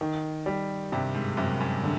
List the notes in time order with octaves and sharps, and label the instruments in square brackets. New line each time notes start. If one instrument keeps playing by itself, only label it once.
[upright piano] D#3
G3
[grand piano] G2 [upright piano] C3
[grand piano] G#2
[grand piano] F#2 [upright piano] C3
[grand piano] F#2
[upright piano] D3